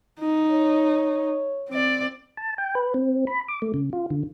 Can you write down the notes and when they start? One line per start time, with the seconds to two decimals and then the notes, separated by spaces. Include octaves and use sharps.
0.20 D#4
0.51 C#5
1.69 C4 D5
2.37 A5
2.58 G5
2.75 B4
2.94 C4
3.27 B5
3.48 D6
3.62 A3
3.74 C#3
3.93 F4
4.10 D3